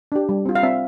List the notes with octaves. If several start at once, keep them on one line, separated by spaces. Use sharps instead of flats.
D4 G4
G3
C4 F4
F5
C4 E5